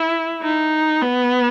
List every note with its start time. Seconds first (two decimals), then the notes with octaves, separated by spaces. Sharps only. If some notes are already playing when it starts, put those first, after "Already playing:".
Already playing: E4
0.42 D#4
1.02 B3